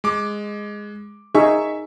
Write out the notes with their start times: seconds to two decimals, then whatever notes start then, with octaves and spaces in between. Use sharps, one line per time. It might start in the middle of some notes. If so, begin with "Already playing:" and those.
0.04 G#3 D6
1.35 D#4 G#4 E5 C#6 E6